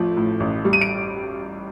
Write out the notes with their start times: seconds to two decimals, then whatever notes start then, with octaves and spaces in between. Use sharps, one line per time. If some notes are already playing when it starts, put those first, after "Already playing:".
Already playing: A1 F3 A3
0.17 A2
0.40 A1
0.65 G3
0.73 D#7
0.81 D7